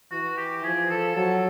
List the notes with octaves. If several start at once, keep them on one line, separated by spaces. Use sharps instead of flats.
E3 F#4
G4
F3 G#4
A4
F#3 A4